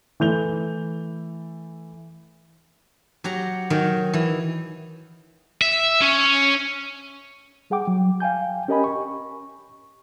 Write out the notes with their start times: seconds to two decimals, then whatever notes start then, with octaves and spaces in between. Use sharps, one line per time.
0.20 E3 A3 G6 F7 G7
3.24 F#3 G4 F#5 A#5
3.70 D#3 F#3 G5
4.13 E3
5.62 E5
6.01 C#4
7.70 G3 G#4 F#5 G5 D6
7.87 F#3
8.20 F5 G5 G#5 G6
8.68 C#4 G4 A#4 D#5 G#5 B5
8.84 C#6